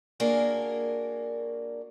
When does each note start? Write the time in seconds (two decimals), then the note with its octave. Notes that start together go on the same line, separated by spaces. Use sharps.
0.20 A#3 D4 F#4 G#4 A#4